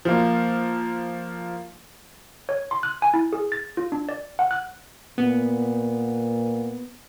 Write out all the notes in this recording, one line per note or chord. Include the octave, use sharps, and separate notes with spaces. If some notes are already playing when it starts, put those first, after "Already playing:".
F3 A#3
C#5
C6
F#6
G#5
E4
G#4
A6
F4
D4
D5
F#5
F#6
A#2 B3